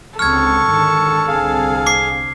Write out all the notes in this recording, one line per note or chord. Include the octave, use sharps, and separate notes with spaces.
C#2 D3 C4 A4 C#6 F6 G#6
G#2 D3 D#3
C2 D3 C4 G#4 F5
D6 C7